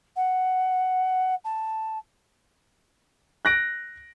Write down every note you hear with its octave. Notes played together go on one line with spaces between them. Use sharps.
F#5
A5
F#6 A#6 D7